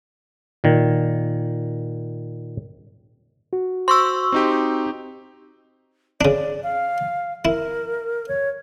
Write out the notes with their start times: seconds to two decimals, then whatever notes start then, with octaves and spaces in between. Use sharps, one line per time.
0.64 A#2 D#3
3.53 F#4
3.88 C5 C6 C#6 E6
4.32 C4 D#4 G4
6.21 C#3 D4 D5
6.63 F5
7.45 E4 A#4
8.28 C#5